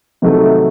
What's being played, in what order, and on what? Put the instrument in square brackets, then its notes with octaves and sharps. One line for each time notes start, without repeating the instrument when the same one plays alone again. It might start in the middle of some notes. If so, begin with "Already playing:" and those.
[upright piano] C3 D#3 F#3 A3